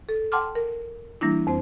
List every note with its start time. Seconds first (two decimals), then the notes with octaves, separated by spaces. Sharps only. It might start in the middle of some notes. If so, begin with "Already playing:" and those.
0.09 A4
0.32 F#5 G5 A5 C6 D6 F6
0.55 A#4
1.21 E3 G3 A#3 D4 E4
1.47 F2 C4 C5